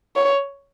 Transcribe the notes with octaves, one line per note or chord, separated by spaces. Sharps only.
C#5